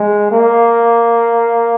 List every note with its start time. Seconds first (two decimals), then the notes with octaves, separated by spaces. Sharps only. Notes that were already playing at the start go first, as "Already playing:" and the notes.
Already playing: G#3
0.31 A#3